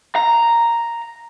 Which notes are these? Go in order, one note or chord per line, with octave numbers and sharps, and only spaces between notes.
A#5